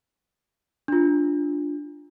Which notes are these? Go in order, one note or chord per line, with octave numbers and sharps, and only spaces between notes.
D4 F4